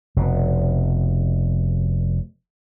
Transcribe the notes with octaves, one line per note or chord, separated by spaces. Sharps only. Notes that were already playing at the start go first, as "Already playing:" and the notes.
F1 B2